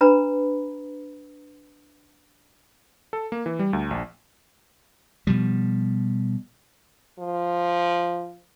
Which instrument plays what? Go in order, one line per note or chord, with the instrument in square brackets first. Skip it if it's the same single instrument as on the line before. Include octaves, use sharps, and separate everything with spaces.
[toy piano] D4 B4 A#5 B5
[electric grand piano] A4
A#3
E3
G3
D2
A#1
[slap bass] B2 F3 G3
[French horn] F3